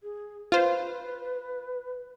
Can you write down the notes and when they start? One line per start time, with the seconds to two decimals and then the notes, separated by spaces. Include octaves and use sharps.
0.03 G#4
0.52 F4 B4 C5